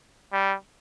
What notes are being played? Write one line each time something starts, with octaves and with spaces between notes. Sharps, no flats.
G3